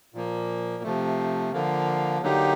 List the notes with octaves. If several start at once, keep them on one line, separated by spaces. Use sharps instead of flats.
A#2 F3 A#3
C3 F3 A3
D3 F3 A#3
D3 F#3 A#3 D#4 G4